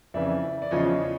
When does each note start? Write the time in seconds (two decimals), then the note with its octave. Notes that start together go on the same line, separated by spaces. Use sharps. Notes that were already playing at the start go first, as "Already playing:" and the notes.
0.14 F2 C#3 E3 D5 E5
0.62 D5
0.71 E2 C#3 F3 C#5 D#5